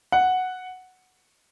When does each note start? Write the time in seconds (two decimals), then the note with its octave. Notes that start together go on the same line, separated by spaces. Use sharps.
0.12 F#5